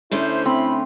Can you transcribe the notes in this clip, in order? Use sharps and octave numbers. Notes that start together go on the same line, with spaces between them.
D3 A3 C#4 E4 C5
C4 E4 B5